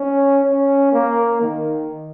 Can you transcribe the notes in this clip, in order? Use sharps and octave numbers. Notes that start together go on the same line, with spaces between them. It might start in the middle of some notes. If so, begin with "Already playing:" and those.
Already playing: C#4
C#4
A#3
D#3